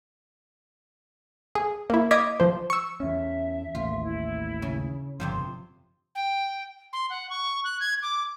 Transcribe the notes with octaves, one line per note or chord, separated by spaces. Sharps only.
G#4
A#3 E4
D#5 F5 D6 G#6 B6
F3 C5
C#6 E6
E2 C#4 E5
A1 D#2 F4
E4
C#3
G1 F2 C3 F3 C6
G5
C6
F#5
C#6
F#6
G#6
D6